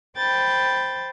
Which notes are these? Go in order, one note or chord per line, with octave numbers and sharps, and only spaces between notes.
C5 G5 B5 G6 A6